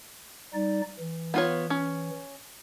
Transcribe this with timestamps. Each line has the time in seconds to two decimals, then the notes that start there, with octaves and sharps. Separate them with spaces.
0.54 G3 D#4 D5
0.99 E3
1.34 B3 F4 C#5
1.70 C#4